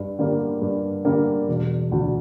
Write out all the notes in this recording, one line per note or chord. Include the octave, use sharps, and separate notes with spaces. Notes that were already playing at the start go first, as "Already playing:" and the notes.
Already playing: G2
D3 G3 A#3
G2
D3 G3 A#3
E1
D2 D3